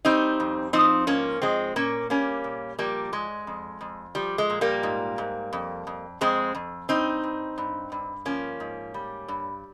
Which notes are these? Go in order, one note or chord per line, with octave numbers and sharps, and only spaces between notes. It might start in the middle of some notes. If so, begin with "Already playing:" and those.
G3 C4 D#4
F2
F3 C4 D#4
G#2 A#3 C#4
F3 G#3 C4
A#2 A#3 C#4
G3 A#3 C#4
A#2
F3 G3 A#3
G#2 G#3
F2
F2
F3 G3
G#3
A#2
G3 A#3
G#2
G#2
F2
F2
F2 G#3 C4
F2
G2 C4 D#4
G2
G2
G2
F3 A#3 C#4
G#2
G3
G2